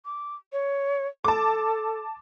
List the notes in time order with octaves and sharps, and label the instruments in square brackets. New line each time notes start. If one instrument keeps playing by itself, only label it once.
[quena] D6
C#5
[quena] A4 [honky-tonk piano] A5 D6